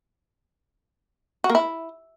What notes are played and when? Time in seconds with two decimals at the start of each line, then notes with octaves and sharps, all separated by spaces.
1.44 F#4
1.50 A#3
1.55 E4